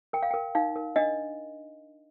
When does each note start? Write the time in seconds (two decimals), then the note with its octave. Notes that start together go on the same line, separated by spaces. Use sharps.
0.13 A#4 G5
0.23 F5
0.31 A#4 G5
0.55 D#4 F5
0.76 A#4
0.96 D4 D#5